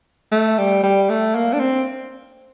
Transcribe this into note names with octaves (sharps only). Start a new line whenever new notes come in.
A3
G3
G3
A3
A#3
D4
C4